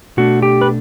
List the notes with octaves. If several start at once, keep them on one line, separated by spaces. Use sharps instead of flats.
B2 A3 D4 F#4
G4
B4